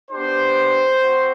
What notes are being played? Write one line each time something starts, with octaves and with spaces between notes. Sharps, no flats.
B3 D4 G4 C5
C4 F#4